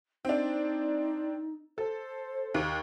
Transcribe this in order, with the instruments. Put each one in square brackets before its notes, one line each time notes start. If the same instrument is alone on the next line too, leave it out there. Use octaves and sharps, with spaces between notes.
[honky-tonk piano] C4 D4 [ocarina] D#4
[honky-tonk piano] A4 [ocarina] C5
[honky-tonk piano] D#2